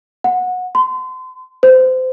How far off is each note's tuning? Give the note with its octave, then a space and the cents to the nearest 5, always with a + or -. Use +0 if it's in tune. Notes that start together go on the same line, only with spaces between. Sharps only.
F#5 -20
C6 -30
C5 -25